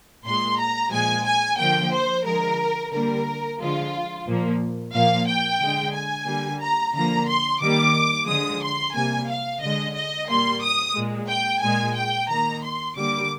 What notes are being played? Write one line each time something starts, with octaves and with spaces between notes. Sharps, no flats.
A#2 G#3 C6
A#5
A#2 F3 G#3 G#5
G#5
D3 F3 A#3 G5
C5
D3 F3 G#3 A#4
D3 G3 A#3 A#4
D3 F3 G#3 F4
A#2 F3 A#3
A#2 F3 A#3 F5
G5
D3 G#3
G#5
D3 G3 A#3
A#5
D3 F3 A#3 A#5
C6
D#3 G3 A#3 D6
D3 F3 G#3 D#6
C6
C3 G3 A#3 G#5
F5
D3 G#3 D#5
D#5
A#2 G3 A#3 C6
D#6
A#2 G#3
G5
A#2 G#3 G#5
G5
D#3 A#3 A#5
C6
D3 G3 A#3 D6